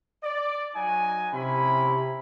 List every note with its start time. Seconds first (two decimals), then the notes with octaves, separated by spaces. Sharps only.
0.24 D5
0.75 F#3 D#4 G#5
1.34 C3 C#4 E4 B5